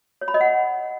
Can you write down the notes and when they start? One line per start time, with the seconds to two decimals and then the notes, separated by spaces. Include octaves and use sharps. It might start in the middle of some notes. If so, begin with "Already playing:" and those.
0.21 C#5
0.28 B5
0.34 D#5
0.41 F#5